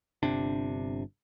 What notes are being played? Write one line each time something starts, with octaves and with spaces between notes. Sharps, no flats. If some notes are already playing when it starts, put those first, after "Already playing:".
G1 C3 D4